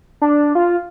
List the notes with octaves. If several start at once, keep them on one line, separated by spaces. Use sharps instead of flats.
D4
F4